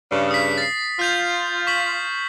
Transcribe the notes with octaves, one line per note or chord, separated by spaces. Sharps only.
G2 C#3
D#6 B6
A6 C7
F4 F6 G6 F7
C#6 B6 F#7